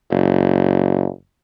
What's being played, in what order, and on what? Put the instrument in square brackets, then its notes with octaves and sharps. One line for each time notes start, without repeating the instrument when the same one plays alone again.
[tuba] F#1